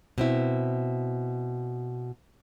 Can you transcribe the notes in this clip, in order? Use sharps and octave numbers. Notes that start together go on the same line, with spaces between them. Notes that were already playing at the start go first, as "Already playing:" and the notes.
B2 C4 E4